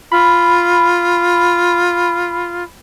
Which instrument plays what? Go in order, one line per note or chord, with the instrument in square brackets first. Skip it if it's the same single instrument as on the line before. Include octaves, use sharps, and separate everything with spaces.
[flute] F4 [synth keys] B5